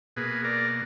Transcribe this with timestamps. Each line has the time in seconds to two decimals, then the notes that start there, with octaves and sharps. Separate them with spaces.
0.16 B2 A#3 G#4 B4
0.44 A#4 D5